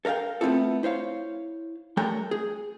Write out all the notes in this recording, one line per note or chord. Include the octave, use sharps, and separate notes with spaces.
A4 A#4 D#5 F5 G5
A3 B3 C4 E4 F4 A4
E4 C5 C#5 F5
G3 A3 A4 A#4 C#5 G5
G#4